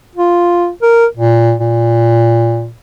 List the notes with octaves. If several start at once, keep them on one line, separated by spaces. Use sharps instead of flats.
F4
A#4
A#2
A#2